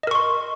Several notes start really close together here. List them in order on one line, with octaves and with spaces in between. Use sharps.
D#5 A#4 C#6 C6